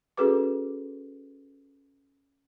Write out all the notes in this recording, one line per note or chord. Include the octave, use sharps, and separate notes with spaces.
C#4 F#4 G#4 A4 B4 D6